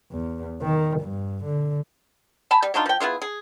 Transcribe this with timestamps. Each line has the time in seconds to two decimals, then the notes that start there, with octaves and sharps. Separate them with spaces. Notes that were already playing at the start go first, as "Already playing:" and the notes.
0.11 E2
0.61 D#3
1.00 G2
1.44 D3
2.51 G#5 A5 B5
2.62 G3
2.74 F#3 D4 D#4 F4
2.86 F3 G5
3.00 B3 E4 F4 G#4
3.22 G#4